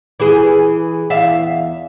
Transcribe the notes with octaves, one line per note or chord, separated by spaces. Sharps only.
E3 G#4
E2 E5 F5